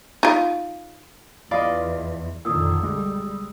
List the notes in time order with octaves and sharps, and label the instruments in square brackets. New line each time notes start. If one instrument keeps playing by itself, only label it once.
[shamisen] D#4 F4
[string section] E2 [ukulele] F4 F5 B5 [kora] D5 D#5
[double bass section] F2 D3 D#3 [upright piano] A#2 [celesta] D#6 E6
[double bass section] B1 G3 [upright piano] G#3